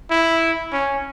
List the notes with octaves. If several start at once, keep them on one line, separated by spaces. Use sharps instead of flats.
E4
C#4